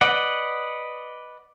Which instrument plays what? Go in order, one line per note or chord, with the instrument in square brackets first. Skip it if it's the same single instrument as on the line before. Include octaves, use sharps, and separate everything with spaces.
[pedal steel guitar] B4 D5 D#5 F#5